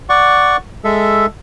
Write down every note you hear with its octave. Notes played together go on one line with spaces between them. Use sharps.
D5 F#5 C#6
G#3 A4 E5